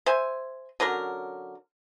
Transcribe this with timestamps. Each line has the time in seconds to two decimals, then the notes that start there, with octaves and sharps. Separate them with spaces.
0.06 C5 E5 G#5
0.80 D3 F#3 C#4 A#4